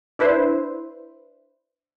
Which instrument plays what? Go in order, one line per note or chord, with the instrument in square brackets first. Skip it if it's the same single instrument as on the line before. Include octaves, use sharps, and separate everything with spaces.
[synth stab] D4 E4 B4 C5